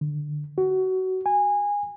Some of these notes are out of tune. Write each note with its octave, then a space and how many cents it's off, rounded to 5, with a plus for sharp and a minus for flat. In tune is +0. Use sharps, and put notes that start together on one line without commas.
D3 +15
F#4 +20
G#5 -20